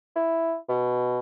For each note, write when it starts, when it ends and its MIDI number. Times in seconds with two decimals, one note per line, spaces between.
0.16 0.55 64
0.69 1.19 47